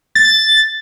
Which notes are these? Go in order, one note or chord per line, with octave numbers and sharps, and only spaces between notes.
A6